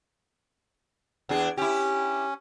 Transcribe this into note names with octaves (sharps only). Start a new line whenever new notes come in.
E2 D4 G#4
C#4 E4 G4